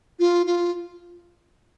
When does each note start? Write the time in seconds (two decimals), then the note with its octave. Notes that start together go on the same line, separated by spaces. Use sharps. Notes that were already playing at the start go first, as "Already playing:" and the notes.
0.19 F4
0.46 F4